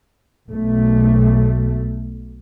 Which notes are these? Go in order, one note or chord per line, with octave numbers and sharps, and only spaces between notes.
B1 A3